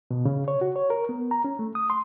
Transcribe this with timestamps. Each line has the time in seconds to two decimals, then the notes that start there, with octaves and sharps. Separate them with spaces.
0.11 B2
0.25 C#3
0.48 C#5
0.61 F#4
0.76 C#5
0.90 A#4
1.09 B3
1.31 A#5
1.44 C#4
1.59 A3
1.75 D#6
1.90 C6